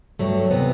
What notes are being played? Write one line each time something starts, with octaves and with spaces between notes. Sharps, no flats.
G2 F#3 A3
C3 E3 B3